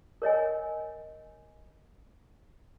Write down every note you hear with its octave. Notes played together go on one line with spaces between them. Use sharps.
A#4 C#5 D#5 G#5